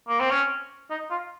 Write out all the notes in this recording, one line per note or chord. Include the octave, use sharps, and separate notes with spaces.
A#3
C4
C#4
D#4
F4